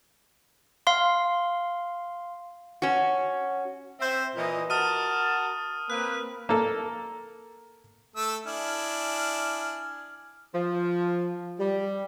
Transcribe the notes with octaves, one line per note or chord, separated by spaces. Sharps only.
F5 C6
C#4 F#4
C4 C5 E5
A#2 E3 D#5
F#4 A#4 A5 D#6 F6 D#7
A#3 C4 B4 F#6
A#3 A4
A3 A4 E6
D4 E4 G#5 D#6 F6
F3
G3